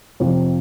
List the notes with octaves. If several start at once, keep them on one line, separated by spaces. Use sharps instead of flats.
F2 C3 F3 C4